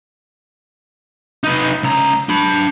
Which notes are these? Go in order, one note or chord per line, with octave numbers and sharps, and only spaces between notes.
D#4 B4
C#2 A#5
D4 B5